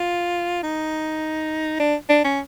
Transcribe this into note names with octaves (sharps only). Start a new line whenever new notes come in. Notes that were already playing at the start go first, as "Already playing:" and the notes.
Already playing: F4
D#4
D4
D4
C#4